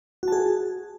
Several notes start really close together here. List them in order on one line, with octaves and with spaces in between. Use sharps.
F#4 A5 G#4